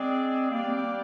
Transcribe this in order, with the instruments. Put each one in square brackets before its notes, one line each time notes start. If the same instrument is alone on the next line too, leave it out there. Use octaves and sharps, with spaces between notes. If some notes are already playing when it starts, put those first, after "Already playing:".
Already playing: [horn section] G#3 D4 G#4 D5 [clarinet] C4
[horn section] G3 D4 G4 D5 F5 [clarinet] A#3
[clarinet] C4
C4
A#3